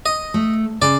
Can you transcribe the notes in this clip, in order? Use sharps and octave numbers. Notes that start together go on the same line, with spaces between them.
D#5
A3
C#3 D5